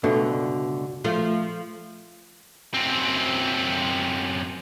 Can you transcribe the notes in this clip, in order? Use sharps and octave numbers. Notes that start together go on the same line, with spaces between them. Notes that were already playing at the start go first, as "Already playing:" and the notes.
C#2 G2 B2 D3 A3
F3 A3 F4
F#2 C4